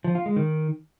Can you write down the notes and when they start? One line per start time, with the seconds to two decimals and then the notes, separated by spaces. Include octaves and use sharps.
0.04 F3
0.15 F4
0.26 G#3
0.36 D#3